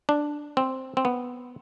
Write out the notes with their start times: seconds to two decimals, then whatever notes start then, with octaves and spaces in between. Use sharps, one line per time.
0.09 D4
0.57 C4
0.97 C4
1.05 B3